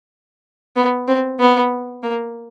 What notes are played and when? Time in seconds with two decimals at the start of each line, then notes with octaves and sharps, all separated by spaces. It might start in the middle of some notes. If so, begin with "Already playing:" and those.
0.76 B3
1.08 C4
1.40 B3
2.03 A#3